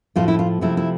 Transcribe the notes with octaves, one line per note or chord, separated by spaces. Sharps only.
A2 F3 A3 F4
E4
F4
C3 F3 A3 E4
E4